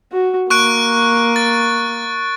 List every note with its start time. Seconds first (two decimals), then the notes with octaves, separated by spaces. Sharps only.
0.12 F#4
0.50 A#3 C#6 F#6 D7
1.36 A6